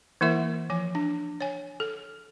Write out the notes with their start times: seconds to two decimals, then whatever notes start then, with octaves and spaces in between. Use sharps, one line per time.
0.21 E3 A#3 E4 A#4 E5
0.70 F3 G#5
0.95 D4
1.41 C#5 G#5
1.80 A4